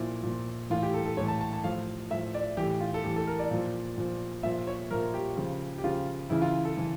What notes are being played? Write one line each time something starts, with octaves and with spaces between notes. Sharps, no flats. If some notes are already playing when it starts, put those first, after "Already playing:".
Already playing: A#2 F3 E4
A#2 F3
A2 E3 F4
G4
A4
A4
A2 E3 C#5
A5
A5
A5
A2 F3 F5
A2 F3 E5
D5
A2 E3 G4
F4
A4
A2 E3 G4
A4
A#4
D5
A#2 F3
A#2 F3
A#2 F3 E5
C#5
A#2 F3 A#4
G4
C#3 F3
G4
C#3 F3 F4
C#3 E3 E4
F4
A4
C#3 E3